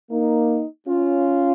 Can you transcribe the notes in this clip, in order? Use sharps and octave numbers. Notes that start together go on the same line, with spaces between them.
A#3 D#4
C#4 F4